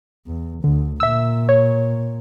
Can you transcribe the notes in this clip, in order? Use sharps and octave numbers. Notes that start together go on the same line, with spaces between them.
E2
D2 D3
A#2 E5 E6
C#5